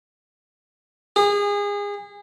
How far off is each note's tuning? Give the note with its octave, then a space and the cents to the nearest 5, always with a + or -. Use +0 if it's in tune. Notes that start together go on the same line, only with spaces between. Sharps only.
G#4 -30